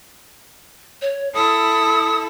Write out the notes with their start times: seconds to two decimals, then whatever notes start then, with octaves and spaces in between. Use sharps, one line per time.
1.02 C#5
1.35 E4 A4 D#6